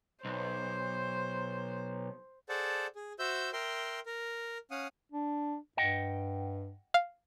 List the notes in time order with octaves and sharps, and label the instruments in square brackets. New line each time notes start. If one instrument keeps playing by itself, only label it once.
[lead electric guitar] B1 [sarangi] C5
[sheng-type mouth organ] G#4 A4 C5 D5 F#5 A5
G#4
F#4 C5 E5 E6 G6
A#4 E5 G5 C6
A#4
C#4 F5 F#5 D#6
[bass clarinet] D4
[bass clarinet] G2 [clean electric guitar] D#5 F#5 G5
[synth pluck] F5